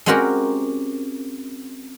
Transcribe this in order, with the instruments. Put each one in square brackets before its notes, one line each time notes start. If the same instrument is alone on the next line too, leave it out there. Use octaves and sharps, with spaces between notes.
[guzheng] G#3 C4 C#4 F#4 G4 A#4